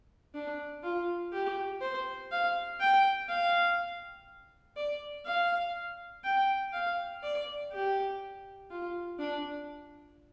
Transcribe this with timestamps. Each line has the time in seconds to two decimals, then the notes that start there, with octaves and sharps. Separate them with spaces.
0.34 D4
0.83 F4
1.33 G4
1.82 C5
2.31 F5
2.80 G5
3.29 F5
4.76 D5
5.26 F5
6.24 G5
6.73 F5
7.23 D5
7.72 G4
8.70 F4
9.19 D4